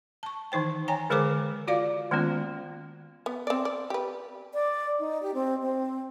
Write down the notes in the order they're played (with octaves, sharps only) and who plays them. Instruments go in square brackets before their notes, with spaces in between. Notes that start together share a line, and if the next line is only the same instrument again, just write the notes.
[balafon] A5 C#6
D#3 E3 D#4 C5 G5
C#5 G5 G#5 A#5
D3 G#3 G#4 A#4 C5 D6
F4 F#4 D5 F5 D6
D#3 G#3 A#3 B3 C#4 F4
[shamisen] B3
C4 D5
D5
G4 B4
[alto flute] D5
D#4
G4
C4
C4